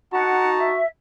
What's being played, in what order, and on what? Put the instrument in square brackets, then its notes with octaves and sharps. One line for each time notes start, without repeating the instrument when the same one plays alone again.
[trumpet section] D#4 A5 A#5 [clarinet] F#4 [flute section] F#5
[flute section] E5